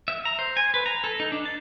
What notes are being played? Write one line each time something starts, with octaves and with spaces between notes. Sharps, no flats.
E5
A#5
C5
G#5
B4
A#5
A4
D#4
D4
A5